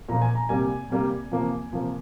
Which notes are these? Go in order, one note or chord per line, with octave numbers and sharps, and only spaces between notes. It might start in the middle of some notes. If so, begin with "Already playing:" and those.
A#2 F3 A#3 A#5
G#5
A#5
C3 G3 A#3 G#5
C3 G3 A#3
C3 F3 A#3
C3 F3 A#3